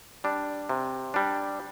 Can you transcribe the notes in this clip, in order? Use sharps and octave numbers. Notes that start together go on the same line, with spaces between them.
G3 D4
C3
G3 D4